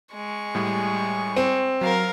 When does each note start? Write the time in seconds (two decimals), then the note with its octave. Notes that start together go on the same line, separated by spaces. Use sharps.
0.14 G#3 C#6
0.55 A2 G3 G#5
1.36 C4
1.81 F#3 A#4 F5